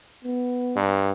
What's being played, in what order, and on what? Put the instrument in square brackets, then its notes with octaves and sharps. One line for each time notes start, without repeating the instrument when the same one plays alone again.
[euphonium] B3
[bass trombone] G2